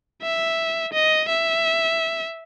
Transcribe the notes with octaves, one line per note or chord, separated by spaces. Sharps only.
E5
D#5
E5